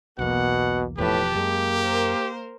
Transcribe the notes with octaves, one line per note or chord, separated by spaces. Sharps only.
B1 E2 B2 A#3 F#5
E1 E2 A2 F3 G4 B4 A5
F#2 G#3 A#3
A#4 C5